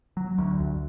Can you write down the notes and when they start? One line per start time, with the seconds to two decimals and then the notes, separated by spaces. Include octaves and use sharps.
0.17 F#3
0.38 D2
0.60 D2